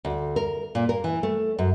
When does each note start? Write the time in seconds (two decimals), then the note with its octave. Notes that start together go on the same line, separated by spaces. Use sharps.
0.05 D2
0.36 A#4
0.75 A#2
0.89 A#4
1.04 E3
1.23 A3
1.59 F#2